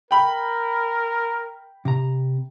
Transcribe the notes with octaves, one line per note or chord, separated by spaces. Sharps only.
A#4 G5 B5
C3 A#5